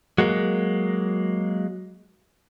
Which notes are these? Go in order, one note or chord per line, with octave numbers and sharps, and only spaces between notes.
F#3 G#3 A#3